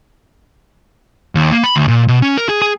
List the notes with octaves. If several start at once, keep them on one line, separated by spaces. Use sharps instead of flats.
D#2
A#3
B5
D2
A#2
B2
C#4
A#4
G#4
G#4